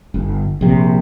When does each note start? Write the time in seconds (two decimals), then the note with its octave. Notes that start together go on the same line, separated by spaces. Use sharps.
0.14 G1
0.61 A#1 C3